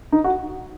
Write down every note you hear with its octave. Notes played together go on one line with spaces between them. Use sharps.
D#4
F#4